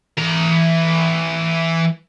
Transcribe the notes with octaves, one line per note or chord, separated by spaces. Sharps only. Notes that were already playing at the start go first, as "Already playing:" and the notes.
E3 A#5